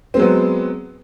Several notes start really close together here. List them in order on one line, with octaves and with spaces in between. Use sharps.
C4 G#3 F#3 B3